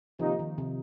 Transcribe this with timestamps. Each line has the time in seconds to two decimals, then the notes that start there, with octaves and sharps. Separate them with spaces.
0.20 C3 D#3 F3 A#3 D#4
0.39 D#3
0.58 C3